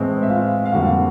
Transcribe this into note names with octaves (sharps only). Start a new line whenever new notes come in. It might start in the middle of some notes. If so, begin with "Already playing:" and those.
Already playing: A2 E3 G#3 C4 C5
E5
F4 F5
F5
F2 D3 G3 A#3 F#4 F#5